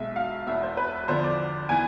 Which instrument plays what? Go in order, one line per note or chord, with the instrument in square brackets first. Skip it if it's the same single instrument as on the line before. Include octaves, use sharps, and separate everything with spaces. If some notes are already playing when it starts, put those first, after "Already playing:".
Already playing: [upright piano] B1 B2 G#3 E5
F5
E1 E2 B2 B3 E5
C5
B4
E2 D3 F3 B3 D4 C5
D5
E3 B3 G#5